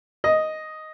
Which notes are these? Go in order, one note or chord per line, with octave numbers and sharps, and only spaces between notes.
D#5